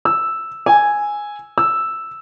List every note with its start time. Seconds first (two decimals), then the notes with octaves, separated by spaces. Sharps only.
0.05 E6
0.66 G#5
1.58 E6